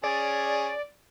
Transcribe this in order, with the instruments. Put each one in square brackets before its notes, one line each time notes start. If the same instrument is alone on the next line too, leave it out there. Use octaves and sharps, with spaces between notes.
[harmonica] C#4 G#4 [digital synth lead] D5